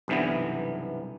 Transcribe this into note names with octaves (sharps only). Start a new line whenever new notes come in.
B1 G2 C3 E3 B3